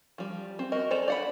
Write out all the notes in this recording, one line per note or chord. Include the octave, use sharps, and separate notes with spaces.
F3 G3
C4
F#4 A#4 D#5
A4 C5 D5 G#5 A#5
D5 F#5 B5